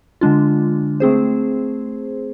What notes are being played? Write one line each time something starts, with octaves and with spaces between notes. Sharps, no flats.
D3 G#3 D4 F4
A3 C4 G#4 C5